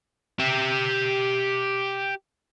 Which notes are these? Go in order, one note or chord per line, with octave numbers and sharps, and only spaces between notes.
G4 E5